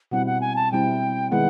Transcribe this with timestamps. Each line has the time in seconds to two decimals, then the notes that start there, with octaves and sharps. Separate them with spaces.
0.11 B2 G3 C4 E4 F#5
0.26 F#5
0.41 G#5
0.56 A5
0.71 B2 G3 C4 E4 G5
1.31 D#3 G#3 B3 E4 F#5